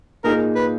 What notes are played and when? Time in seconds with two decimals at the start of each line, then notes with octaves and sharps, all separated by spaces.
0.24 A#2 A#3 D#4 G#4 A#4
0.55 B4